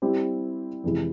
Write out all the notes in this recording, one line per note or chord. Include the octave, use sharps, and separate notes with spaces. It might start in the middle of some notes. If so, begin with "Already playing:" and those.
G3 C4 E4 G4
F2 C3 E3 G#3 E4